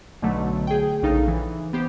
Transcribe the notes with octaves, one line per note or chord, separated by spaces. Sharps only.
B1 B2 D3 F#3 A3
G#4 G5
A#1 C#3 D#4 A4 F5
E3
B3 G4 C5